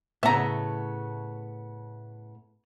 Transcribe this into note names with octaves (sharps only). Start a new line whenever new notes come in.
A2 C#3 A3 B3 E5 A#5